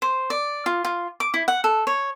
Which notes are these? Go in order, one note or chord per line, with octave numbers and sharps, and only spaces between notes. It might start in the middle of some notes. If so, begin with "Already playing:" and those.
C5
D5
F4
F4
D6
E4
F#5
A4
C#5